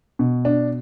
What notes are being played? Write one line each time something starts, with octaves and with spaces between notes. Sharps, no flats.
B2
D4